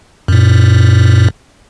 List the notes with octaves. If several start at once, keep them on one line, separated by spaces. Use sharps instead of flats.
F#2 A#2